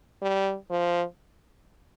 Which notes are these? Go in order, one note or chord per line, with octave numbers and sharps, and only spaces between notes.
G3
F3